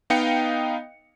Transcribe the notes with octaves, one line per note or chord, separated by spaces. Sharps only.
B3 D#4 D#5 F5 G5 C#7